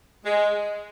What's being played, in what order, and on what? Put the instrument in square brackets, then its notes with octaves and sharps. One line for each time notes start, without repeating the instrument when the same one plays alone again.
[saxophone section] G#3